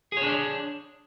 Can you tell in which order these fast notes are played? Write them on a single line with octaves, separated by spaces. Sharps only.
G#4 C#5 D4 D5